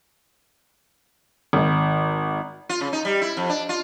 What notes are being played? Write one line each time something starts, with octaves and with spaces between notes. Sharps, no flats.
G#1
F4
C#3
D#4
G3
E4
F2
D4
F4